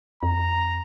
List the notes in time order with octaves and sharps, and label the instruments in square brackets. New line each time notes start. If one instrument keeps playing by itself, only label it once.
[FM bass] F2 [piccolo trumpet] A#5